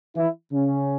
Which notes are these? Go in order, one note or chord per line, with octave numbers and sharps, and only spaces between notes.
E3 E4
C#3 C#4